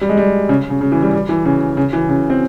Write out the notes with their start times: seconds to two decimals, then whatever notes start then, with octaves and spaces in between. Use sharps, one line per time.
0.01 G3
0.09 G#3
0.17 G3
0.49 C#3
0.70 C#3
0.81 C#3
0.92 E3
1.02 G3
1.13 G3
1.29 E3
1.45 C#3
1.77 C#3
1.93 E3
2.09 C#3
2.30 C4